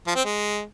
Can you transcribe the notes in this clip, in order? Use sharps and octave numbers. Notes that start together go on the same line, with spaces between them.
F3
C4
G#3